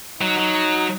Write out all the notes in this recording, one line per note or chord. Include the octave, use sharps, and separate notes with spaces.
F#3 D#4
F#3